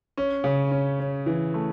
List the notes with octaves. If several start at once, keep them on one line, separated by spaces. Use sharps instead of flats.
C#4
C#3
C#4
C#4
E3
A3